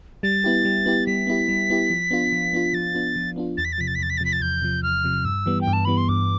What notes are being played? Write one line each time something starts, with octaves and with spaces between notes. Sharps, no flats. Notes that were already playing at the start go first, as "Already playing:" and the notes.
G3 A6
B3 E4 G4
G3
B3 E4 G4
G3 B6
B3 E4 G4
G3
B3 E4 G4
F3
B3 D4 F4
F3
B3 D4 F4
F3 A6
B3 D4 F4
F3
B3 D4 F4
E2 A6
B6
A6
C3 F3 B6
A6
B6
E2 A6
B6
A6
C3 F3 B6
A6
E2 G6
C3 F3
E2 F6
C3 F3
G2 E6
E3 G3 B3
G5
G2
A5
E3 G3 B3 B5
C6
G2 D6